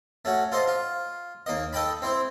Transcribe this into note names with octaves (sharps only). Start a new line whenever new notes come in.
A3 C#4 F#4
F4 A4 C5 D#5
F4
D#2 A#3 D#5
A4 D#5 G5 A5 B5
C4 E4 C5